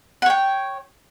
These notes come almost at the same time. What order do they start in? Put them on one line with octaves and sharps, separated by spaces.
F#5 C#5 G5